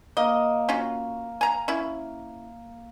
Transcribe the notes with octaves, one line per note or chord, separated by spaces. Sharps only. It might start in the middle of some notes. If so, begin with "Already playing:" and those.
A#3 D#5
C#4 F4 F#4
G#5 A#5
C#4 E4